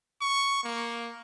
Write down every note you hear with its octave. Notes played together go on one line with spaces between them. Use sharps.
C#6
A#3